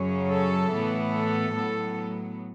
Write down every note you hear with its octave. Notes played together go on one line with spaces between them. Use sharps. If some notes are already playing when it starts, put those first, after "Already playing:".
Already playing: F#2 C#3 F#3 C#4
A4
A2 E3 B3
A4
A2 F#3 B3